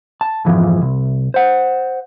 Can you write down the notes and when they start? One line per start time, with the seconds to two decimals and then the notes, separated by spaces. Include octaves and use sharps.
0.21 A5
0.45 F2 G#2 E3 F3
0.82 C2
1.34 C5 F#5